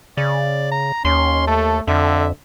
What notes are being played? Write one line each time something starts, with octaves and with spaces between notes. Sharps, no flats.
C#3 D5
A#5
D#2 C#4 C6
A3 A4
F2 D3 E5